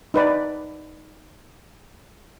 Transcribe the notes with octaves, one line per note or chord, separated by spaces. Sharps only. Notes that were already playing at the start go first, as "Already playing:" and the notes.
D#4 B4 D5